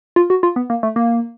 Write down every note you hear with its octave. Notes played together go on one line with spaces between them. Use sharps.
F4
F#4
F4
B3
A#3
A3
A#3